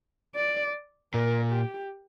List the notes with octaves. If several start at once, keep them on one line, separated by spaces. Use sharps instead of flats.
D5
A#2 A#4
G4